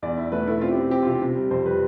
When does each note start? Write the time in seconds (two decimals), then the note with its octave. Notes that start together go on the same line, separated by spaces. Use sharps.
0.02 E2 D5
0.17 E4
0.32 A3 B4
0.47 E4 A4
0.61 C4 F4
0.71 G4
0.77 C4
0.91 C4 G4
1.02 F4
1.07 C3 G4
1.22 C3
1.36 G3
1.51 F2 C5
1.66 G3 B4